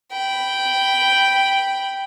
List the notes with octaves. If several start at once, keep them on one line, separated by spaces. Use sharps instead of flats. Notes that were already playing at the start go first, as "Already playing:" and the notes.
G5 B5